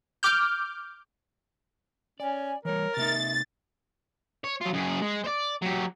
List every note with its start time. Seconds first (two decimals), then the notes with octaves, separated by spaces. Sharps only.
0.23 D6 F6 G6
2.20 C#4 D5 G#5
2.65 E3 G3 A#4 C#5
2.97 C3 A#3 D#4 E5 A6
4.44 C#5
4.61 F#3 F4
4.73 F#2 G#4
5.01 G#3
5.24 C5 D5
5.62 F#3 G4